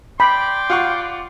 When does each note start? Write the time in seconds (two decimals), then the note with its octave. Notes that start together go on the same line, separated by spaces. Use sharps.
0.20 D5 G5 B5 C6 D6
0.70 F4 F#5 C#6